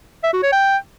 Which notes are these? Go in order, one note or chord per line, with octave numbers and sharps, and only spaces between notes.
E5
F#4
C#5
G5